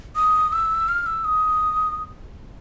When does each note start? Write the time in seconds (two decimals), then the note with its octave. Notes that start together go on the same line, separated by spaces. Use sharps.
0.16 D#6
0.52 E6
0.88 F6
1.06 E6
1.24 D#6